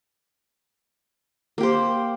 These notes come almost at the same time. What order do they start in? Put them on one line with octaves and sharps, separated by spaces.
A#3 G4 C5